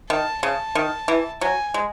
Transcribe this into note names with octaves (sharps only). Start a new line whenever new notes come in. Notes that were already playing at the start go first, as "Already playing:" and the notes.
D#3 A5
C#3 A5
D#3
E3
F#3 G#5
G#3